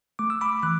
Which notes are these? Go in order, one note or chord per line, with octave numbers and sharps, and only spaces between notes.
A3 D6
E6
B5 D6
E3 D6 F#6